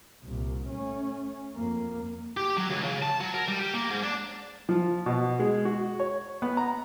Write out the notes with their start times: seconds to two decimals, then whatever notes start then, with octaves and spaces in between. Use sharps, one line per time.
0.23 C2 A#2
0.69 A3 C#4
1.55 F2 A#3
2.37 G4
2.57 F#3
2.70 C#2
2.84 C#3
3.02 A5
3.21 F#3
3.35 A#4
3.48 G3
3.60 G4
3.74 A#3
3.91 G#2
4.03 D4
4.69 F3
5.06 B2
5.39 G#3
5.65 F#4
5.99 C#5
6.42 B3
6.57 A#5